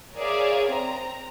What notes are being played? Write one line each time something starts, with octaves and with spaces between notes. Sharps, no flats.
G#4 A#4 C#5 D5 E5 F5
C4 A#5